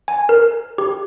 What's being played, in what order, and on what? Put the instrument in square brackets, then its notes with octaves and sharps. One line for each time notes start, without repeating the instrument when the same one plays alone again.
[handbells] G#5
A#4
G4